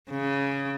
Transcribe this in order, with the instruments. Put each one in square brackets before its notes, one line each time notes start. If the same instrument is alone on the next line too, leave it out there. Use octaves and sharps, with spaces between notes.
[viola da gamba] C#3